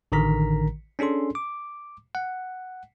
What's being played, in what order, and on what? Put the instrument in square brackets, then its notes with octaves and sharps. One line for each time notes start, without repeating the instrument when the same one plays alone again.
[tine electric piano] A1 D3 D#3 A#4 A#5 B6
C#4 D4 G#4 A4 C6
D6
F#5